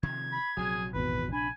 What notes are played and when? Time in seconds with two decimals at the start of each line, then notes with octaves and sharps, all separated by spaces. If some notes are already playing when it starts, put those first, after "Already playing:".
0.03 C3 D#3 F3 G#6
0.32 B5
0.57 A#1 C3 F#3 G#4
0.94 G#1 E2 B2 B4
1.33 D4 G#5 B5